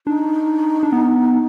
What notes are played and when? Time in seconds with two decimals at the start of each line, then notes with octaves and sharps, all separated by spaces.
0.06 D4 D#4
0.83 D4
0.92 B3